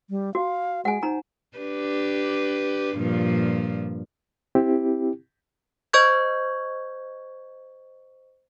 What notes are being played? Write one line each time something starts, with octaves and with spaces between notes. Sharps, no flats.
G3
F#4 F5
G#3 F#5 G#5
D#4 C5 A#5
D4 G4 B4
G2 A#2 F3
C4 E4 G4
C5 D#5 C#6 G6 G#6